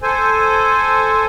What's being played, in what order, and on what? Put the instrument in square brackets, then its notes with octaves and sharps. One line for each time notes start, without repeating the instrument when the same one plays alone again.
[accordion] A4 C5 G#5